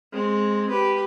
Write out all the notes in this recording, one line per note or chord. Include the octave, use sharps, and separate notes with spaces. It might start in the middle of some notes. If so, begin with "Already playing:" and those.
G#3 C4
G4 B4